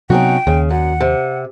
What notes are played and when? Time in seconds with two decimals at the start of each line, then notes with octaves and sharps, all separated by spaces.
0.10 C3 F#3 B3 C#4 D#4 F#4 G5
0.47 D#2 C#3
0.70 F#2 F#5
1.00 C3